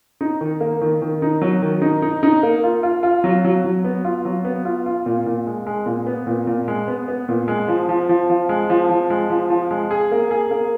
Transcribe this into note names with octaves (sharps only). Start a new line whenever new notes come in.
D#4
D#3
A#3
D#3
D#3
D#4
F#3
D#3
D#4
D#4
D#4
A#3
F4
F4
F4
F#3
F#3
F#3
B3
F4
F#3
B3
F4
F4
A#2
A#2
G#3
G#3
A#2
B3
A#2
A#2
G#3
B3
B3
A#2
G#3
F3
F3
F3
F3
G#3
F3
F3
G#3
F3
F3
G#3
G#4
A#3
G#4
A#3